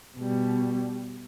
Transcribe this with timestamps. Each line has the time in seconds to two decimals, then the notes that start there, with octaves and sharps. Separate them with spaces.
0.18 B2 G3